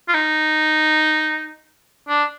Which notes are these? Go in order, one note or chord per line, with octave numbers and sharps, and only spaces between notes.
F4
D#4
D4